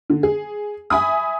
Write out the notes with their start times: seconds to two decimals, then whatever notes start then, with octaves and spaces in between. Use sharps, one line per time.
0.10 D3
0.23 G#4
0.90 E5 G#5 B5 D#6